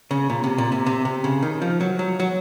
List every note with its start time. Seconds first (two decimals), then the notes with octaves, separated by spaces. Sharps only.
0.11 C#3
0.30 A#2
0.44 C3
0.58 A#2
0.72 C3
0.86 C3
1.05 C3
1.24 C#3
1.43 D#3
1.62 F3
1.81 F#3
1.99 F#3
2.20 F#3